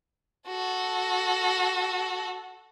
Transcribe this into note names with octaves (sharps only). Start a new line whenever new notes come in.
F#4 A4